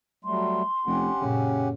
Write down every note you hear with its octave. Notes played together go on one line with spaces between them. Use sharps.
F#3 G3 A3 C6
F1 C#4 G4 F#5
F#2 A#2 C#3